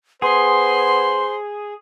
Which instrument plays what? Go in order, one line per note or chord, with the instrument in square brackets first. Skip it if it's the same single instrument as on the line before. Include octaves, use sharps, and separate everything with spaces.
[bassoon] B3 [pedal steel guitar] G#4 [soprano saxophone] C5 [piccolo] C6